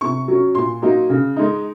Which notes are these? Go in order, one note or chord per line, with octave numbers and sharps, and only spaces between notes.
C3 C#6
F#3 C#4
A#2 C6
F#3 A#3 D#4
C#3
G#3 D#4